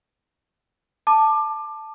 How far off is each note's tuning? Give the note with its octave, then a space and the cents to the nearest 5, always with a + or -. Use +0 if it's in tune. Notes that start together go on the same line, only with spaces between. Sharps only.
A5 +0 D6 +20